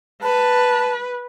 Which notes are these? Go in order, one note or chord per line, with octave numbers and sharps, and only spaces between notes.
B4 A5